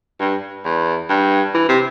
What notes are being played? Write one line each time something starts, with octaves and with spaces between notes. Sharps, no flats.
G2
E2
G2
E3
C3